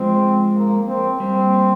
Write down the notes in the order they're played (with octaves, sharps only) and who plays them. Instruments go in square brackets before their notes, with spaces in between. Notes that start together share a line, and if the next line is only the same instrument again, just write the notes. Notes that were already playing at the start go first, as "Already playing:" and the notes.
Already playing: [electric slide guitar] F3 G#3 [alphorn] C4
[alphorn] A#3
C4
[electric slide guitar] G3 A#3 [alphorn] C4